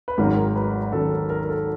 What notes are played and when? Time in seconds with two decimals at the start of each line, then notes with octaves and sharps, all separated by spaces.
0.08 B4
0.18 G#1 G#2 D#3 F#3 A#4
0.37 A#4
0.56 B4
0.92 G#1 G#2 D#3 F#3 A4
1.11 A#4
1.30 A#4
1.43 A#4
1.49 A4